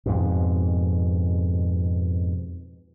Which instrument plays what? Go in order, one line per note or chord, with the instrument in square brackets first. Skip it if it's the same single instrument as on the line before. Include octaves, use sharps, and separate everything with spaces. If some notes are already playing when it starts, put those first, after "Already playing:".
[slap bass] F2 G#2 B2